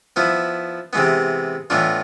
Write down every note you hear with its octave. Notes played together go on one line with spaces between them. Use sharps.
F3 B3 E4
C3 E3 G#3 B3
A2 E3 B3 D4 F4